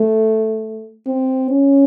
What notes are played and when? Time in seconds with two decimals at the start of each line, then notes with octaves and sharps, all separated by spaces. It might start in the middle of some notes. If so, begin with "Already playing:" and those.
Already playing: A3
1.07 C4
1.51 C#4